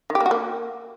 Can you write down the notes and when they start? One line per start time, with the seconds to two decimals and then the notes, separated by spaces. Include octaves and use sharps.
0.10 D#3
0.15 G4
0.20 A#3
0.26 F#4
0.31 A#3